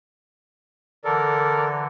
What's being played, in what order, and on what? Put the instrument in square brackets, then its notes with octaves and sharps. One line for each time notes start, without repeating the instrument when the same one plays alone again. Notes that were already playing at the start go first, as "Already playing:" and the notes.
[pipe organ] D3 E3 [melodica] A4 [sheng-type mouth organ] A#4 D5